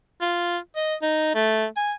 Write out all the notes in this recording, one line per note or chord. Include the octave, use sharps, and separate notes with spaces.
F4
D#5
D#4
A3
G#5